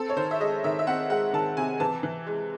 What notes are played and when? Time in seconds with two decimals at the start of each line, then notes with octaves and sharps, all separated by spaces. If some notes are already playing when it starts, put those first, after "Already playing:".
Already playing: C4 A4
0.10 C#5
0.16 D#3 C5
0.31 E5
0.40 G#3 D#5
0.64 D#3 E5
0.79 E5
0.87 C4 F#5
1.10 G#3 F#5
1.33 D#3 A5
1.57 C3 G#5
1.80 E3 A5
2.03 E3
2.27 G#3